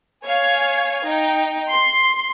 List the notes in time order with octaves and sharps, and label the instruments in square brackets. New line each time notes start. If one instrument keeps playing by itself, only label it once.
[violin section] C#5 F5 G#5 G#6
D#4 G5
C6